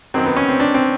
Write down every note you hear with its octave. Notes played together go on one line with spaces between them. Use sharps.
F#2 D#3 F#3 C4
B3
C#4
C4
D4
C4